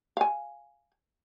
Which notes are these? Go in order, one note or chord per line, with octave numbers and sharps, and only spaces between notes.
F5 G#5